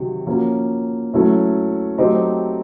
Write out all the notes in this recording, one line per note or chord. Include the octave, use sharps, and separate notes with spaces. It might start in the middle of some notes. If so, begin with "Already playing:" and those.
Already playing: C3 D#3 F#3
F3 A#3 C#4 F#4
F#3 A3 C#4 E4
F#3 A3 C4 D#4 G4